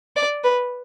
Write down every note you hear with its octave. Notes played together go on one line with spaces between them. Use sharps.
D5
B4